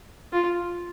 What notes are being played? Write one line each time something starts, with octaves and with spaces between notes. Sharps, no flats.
F4